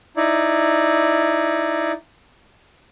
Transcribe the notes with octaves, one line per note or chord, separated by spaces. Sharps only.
D#4 E4 D5